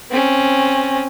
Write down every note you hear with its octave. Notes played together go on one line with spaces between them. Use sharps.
C4 C#4